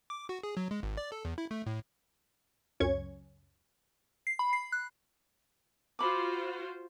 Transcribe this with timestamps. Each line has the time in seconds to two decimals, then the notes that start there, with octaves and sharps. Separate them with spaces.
0.10 D6
0.29 F#4
0.43 G#4
0.57 F#3
0.71 G#3
0.83 G#1
0.97 D5
1.12 A4
1.25 E2
1.38 E4
1.51 A3
1.66 A2
2.80 C#2 F#2 C#4 C#6 G#6
4.27 C7
4.39 B5
4.53 C7
4.72 F#6
5.99 F4 F#4 C5 B5 D6